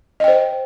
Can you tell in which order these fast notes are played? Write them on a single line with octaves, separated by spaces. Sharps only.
D#5 G5 C5